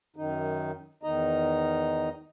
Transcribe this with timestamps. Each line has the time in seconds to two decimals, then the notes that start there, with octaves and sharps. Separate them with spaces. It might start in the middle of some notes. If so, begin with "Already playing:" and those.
0.16 F#2 D#3 D#4
1.03 E2 D#3 D#4 D#5 A#5